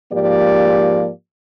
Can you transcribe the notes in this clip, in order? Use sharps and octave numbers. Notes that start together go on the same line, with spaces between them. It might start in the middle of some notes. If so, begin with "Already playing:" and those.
G#2 F3 A#3 G4 D5